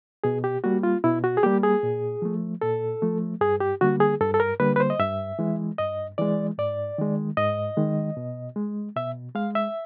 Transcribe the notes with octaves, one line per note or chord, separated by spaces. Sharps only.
B2 G#4
G4
G3 A#3 F#4
F4
B2 E4
F#4
G#4
G3 A#3 G4
G#4
A#2
F3 A3
A#2 A4
F3 A3
G2 G#4
G4
D3 G3 A#3 F#4
G#4
G2 A4
A4
A#4
D3 G3 A#3 B4
B4
C5
D#5
G2 E5
E3 G#3
G2 D#5
E3 G#3 D5
G#2 D5
D#3 G#3
G#2 D#5
D#3 G#3
B2
G#3
B2 E5
G#3 F5
E5